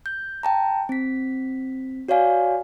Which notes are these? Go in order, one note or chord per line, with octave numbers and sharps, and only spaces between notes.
G6
G5 A5 A#5
C4 B6
F#4 C#5 D5 F5 G#5